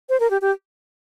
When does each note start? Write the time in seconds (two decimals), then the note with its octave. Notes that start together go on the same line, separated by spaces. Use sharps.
0.09 C5
0.20 A#4
0.31 G4
0.42 G4